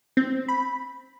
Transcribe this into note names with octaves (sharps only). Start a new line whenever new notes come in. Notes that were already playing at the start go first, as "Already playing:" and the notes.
C4
B5